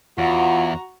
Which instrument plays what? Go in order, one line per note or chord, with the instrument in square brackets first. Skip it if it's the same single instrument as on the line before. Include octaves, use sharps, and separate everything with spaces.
[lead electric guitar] E2 [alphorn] F4 [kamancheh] F#4 A#5 [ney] F#5